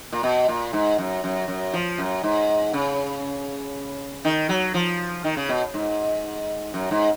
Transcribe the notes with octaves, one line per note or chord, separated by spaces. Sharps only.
A#2
B2
A#2
G#2
F#2
F#2
F#2
F3
F#2
G#2
C#3
D#3
F#3
F3
D#3
C#3
B2
G#2
F#2
G#2